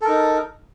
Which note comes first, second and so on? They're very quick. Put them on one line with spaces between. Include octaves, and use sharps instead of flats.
A4 A#4 D#4